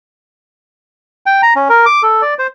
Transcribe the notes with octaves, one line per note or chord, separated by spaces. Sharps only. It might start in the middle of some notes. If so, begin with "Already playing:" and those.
G5
A#5
C#4
A#4
D6
A4
D5
C5